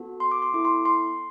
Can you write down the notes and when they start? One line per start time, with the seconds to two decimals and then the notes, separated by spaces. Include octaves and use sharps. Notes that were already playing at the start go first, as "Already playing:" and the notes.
Already playing: B3 F#4 A4
0.20 C6
0.32 D6
0.42 C6
0.52 B3 E4 A4 D6
0.65 C6
0.85 C6